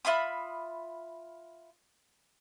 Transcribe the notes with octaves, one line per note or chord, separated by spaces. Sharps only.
F4 E5 B5 D#6